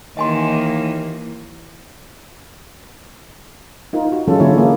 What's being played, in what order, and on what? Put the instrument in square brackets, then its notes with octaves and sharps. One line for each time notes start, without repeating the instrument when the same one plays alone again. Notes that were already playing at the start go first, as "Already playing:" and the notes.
[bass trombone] D#2 [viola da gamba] D#3 E3 [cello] A#3 [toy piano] D#5 G#5 C6
[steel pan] D#4 F4 A#4
F#4
E3 F#3 G#3 C#4 F4 A4
D3 A#3 D4 E4 F4 C#5
C#3 G#3 A#3 G#4